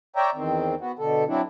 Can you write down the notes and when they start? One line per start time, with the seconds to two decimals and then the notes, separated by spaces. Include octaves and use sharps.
0.16 C#5 D5 E5 G5 A#5
0.35 E2 D#3 C4
0.81 B3 F#4
0.99 B2 D3 A4
1.27 F#3 C4 D4 E4